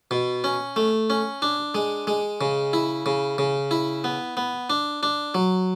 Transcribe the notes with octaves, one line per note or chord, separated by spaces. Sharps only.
B2
C#4
A3
C#4
D4
G#3
G#3
C#3
E4
C#3
C#3
E4
B3
B3
D4
D4
F#3